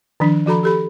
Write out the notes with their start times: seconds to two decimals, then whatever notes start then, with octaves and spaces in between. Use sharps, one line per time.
0.20 D#3 F3 D4
0.46 F3 F#4 A4 A#5 B5
0.63 G4 A4 B5